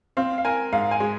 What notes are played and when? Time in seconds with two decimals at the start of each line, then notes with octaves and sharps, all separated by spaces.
0.17 C4 F5
0.38 F5
0.45 A#4 G#5
0.73 G#2 F5
0.91 G#5
1.00 G#3